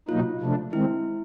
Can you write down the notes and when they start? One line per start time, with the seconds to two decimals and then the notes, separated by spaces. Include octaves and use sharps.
0.09 B2 F#3 A#3 D#4 F4
0.41 C3 F3 A3 D4
0.72 D#3 G#3 C4 E4